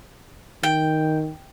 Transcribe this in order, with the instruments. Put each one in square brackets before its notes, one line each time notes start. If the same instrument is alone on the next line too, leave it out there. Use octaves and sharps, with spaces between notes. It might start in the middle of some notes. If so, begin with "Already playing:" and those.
[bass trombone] D#3 [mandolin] G5